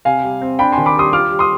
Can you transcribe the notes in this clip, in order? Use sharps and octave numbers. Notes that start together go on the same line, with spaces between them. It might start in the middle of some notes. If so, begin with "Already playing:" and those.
C3 F5 G#5
G3
C4
D4 G5 B5
G#5 C6
D#3
B5 D6
G3 C6 D#6
F4 D6 F6
G3
C6 D#6